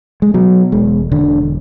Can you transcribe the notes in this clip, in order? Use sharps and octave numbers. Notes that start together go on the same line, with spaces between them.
G#3
B2 F#3
E1 G#3
E1 D3